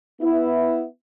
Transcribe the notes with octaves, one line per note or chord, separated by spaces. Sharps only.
B3 E4